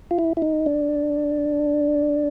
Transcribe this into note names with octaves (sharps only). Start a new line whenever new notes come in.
F4
E4
E4
D#4
D4